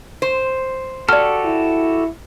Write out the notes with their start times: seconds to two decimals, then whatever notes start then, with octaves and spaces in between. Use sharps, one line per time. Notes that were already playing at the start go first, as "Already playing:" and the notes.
0.22 C5
1.09 F#4 G4 A4 D5 F6
1.44 E4